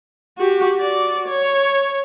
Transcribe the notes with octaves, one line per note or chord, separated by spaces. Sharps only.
F#4 G4
F#4 D5
C#5